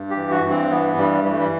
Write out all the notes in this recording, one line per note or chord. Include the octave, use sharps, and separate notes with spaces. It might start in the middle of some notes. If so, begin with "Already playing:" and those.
Already playing: G2
G4
E3
F#4
G2
C4
E3 B3
G2 G3
E3 G3
A3
G3